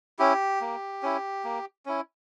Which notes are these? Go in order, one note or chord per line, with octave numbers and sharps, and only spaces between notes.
C#4 E4 G4
A#3
C#4 E4
A#3
C#4 E4